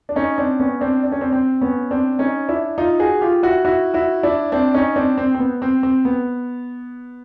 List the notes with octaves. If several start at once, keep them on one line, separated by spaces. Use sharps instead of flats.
D4
C#4 D#4
C4 D4
B3 C#4
C4 D4
D4
C#4
C4 D4
C4
B3 C#4
C4 D4
C#4 D#4
D4 E4
D#4 F4
F#4 G#4
F4 G4
E4 F#4
E4 F#4
E4 F#4
D4 E4
C4 D4
C#4 D#4
C4 D4
C4
C4
B3
C4
C4
B3